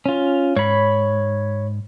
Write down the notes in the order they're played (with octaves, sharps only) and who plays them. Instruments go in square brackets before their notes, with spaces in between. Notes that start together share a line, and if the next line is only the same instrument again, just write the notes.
[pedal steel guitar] C#4 F4
[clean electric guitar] G#2 [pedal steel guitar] C#5 B5